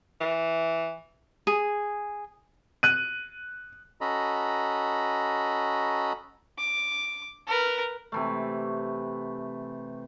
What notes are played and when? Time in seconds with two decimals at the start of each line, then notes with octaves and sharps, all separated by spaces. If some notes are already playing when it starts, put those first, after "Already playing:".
0.21 E3
1.47 G#4
2.83 F#6 D#7
4.01 C#4 F#4 A4 D#5 A#5 B5
6.58 D6
7.47 A#4 B4
8.12 C3 E3 A3